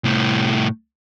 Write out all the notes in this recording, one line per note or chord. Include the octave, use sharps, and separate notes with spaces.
C2 A2